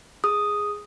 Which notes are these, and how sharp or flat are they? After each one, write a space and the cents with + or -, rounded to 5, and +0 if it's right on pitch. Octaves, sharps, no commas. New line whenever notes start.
G#4 -5 D#6 +0